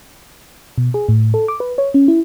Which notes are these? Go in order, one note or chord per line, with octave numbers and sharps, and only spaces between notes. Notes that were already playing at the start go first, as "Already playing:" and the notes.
B2
G#4
A2
A4
D6
B4
C#5
C#4
E4